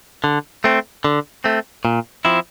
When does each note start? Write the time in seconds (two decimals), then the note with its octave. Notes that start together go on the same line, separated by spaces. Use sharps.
0.24 D3
0.64 A3 C4
1.04 D3
1.44 A3 C4
1.85 A#2
2.25 F3 C4 E4